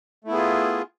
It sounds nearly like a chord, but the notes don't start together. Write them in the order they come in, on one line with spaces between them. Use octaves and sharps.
A3 E4 B3 G#4 F4